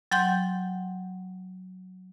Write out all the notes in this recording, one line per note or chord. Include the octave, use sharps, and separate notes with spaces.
F#3 F#5 G5 C6 G6